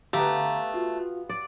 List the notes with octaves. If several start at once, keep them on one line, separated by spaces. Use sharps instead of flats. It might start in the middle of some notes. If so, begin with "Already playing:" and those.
D3 A3 B3 G4 F5 A#5
F4 F#4
D5